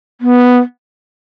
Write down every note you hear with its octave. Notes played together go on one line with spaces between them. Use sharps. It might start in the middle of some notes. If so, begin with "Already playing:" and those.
B3